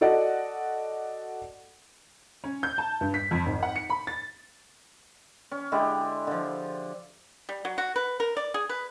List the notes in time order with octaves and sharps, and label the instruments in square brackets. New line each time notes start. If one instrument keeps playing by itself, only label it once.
[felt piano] F#4 A4 D5 D#5 F#5
[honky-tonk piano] C#4
G6
A5
G2
B6
F2
G#1
F#5
C#7
B5
A6
[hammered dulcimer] C#4
D3 G#3 E4 G4
D3 F3
[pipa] G3
F#3
F#4
B4
A#4
D5
G#4
B4